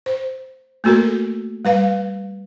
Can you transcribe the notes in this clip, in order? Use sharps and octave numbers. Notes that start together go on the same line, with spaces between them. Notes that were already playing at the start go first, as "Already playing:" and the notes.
C5
A3 A#3 F#4 A4 A#4
G3 B4 F5